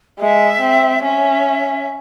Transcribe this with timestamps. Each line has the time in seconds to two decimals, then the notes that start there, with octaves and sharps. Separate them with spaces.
0.19 G#3 E5
0.61 C4
1.03 C#4 E5